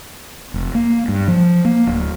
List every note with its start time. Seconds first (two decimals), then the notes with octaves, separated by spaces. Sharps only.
0.54 F1
0.75 A#3
1.08 G2
1.28 F3
1.65 A#3
1.87 D1